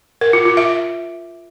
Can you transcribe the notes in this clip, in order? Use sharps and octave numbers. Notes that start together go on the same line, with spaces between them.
A#4
F4
F4
E5